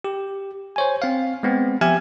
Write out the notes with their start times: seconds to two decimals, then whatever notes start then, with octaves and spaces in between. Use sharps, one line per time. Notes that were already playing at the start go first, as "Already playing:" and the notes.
0.04 G4
0.76 C5 C#5 G#5
1.02 C4 F5
1.43 G#3 B3 C4
1.81 F3 G4 E5 G#5 F6 G#6